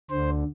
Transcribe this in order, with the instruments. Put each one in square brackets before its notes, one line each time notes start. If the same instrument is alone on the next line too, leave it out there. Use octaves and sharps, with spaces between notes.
[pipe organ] D2 D3 C5